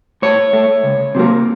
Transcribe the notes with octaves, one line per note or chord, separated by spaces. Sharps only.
A2 C#5
A3
C#2
C3 F#3 A#3